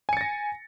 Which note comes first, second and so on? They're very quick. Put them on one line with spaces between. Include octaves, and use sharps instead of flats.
G#5 C#7 A6 A#6